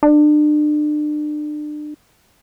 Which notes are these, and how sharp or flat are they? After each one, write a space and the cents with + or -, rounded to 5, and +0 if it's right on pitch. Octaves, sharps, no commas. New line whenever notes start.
D4 +35